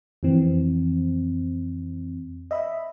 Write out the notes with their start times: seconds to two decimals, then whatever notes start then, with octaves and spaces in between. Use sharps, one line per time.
0.23 F2 E3 C4
2.51 D#5 E5 B5